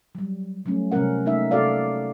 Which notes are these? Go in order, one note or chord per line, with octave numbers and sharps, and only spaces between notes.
F#3 G3
F#3 G3 A3 C#4
C3 G3 C4 C#4 A#4 F#5
A3 A#3 D#4 E5
C3 F#4 A4 D5 F5